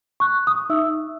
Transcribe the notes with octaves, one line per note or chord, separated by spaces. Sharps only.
C#6 F#6
D#6
D#4 E5 E6